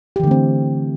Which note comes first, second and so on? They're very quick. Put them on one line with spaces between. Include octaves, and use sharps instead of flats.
G4 E3 D3 A3 C4